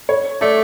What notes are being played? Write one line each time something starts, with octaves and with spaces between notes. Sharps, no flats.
C#5
A3 D5